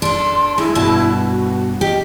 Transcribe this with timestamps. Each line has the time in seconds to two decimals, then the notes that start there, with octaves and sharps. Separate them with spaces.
0.02 D4 A4 C6
0.58 G#3 E4
0.75 G2 B2 A5
1.25 F#4
1.81 G4 D#5